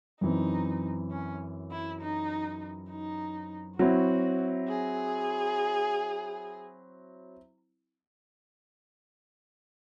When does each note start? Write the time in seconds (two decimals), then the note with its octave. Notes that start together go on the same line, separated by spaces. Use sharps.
0.21 F#2 E3 C4 D#4
1.11 C#4
1.71 E4
2.01 D#4
2.90 D#4
3.79 F#3 C4 E4 F#4
4.68 G#4